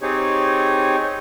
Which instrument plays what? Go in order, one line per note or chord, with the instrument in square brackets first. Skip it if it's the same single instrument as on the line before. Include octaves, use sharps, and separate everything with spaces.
[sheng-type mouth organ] C4 D#4 G4 G#4 C#5